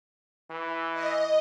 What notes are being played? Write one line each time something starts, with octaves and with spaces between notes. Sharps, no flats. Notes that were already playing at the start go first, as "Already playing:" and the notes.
E3
D#5